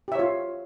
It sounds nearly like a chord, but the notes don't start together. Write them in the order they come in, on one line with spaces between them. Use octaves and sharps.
G4 E5 C#5 F4